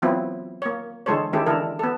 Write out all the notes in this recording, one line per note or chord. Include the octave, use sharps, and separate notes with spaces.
E3 F#3 B3 C4 E4 F4
A#3 C#5
D3 E3 G#3 A4 C5 C#5
D#3 G#3 C#4 E4 G4 A4
D3 E3 D4 E4 A4 A#4
B3 A4